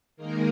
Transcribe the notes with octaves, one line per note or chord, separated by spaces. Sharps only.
D#3 G#3 A#3 D#4 A#4